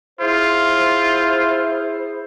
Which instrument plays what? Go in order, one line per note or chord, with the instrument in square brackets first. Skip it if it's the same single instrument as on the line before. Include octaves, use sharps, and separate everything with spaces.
[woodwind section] E4 G#4 C5 [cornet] F4